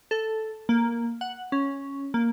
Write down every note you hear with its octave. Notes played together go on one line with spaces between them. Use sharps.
A4
A#3
F#5
C#4
A#3